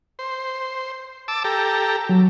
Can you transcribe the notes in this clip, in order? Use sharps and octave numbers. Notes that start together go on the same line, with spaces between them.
C5
A5 D6 E6
G4 A4 A#5
F#3